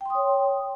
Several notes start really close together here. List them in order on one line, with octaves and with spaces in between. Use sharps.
G5 C6 D#6 C#5